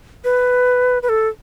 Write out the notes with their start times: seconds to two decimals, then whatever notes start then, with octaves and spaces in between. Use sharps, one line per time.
0.24 B4
1.03 B4
1.09 A4